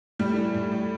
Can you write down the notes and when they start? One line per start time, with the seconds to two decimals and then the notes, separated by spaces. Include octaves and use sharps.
0.19 A2 G3
0.36 E3
0.54 A2
0.72 A2